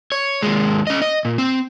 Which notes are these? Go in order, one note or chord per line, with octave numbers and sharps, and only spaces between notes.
C#5
D#2 G#3
C#4 D#5
D#5
A#2
C4